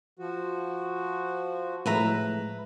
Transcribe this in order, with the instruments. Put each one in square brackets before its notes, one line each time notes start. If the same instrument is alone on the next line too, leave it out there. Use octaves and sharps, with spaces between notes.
[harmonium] F3 F#4
[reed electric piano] A2 F3 G#3 [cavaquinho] B4 E5 A#5